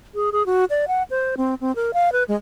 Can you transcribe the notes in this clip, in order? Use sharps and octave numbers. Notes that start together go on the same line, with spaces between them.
G#4
G#4
F#4
D5
F#5
C5
C4
C4
A#4
F5
B4
G#3